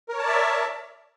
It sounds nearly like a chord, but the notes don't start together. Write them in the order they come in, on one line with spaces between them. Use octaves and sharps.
A#4 C#5 A5 D5 E5